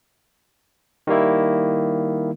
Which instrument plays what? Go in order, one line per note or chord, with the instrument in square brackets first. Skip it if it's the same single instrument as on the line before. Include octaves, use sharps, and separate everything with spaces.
[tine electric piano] D#3 G3 A#3 E4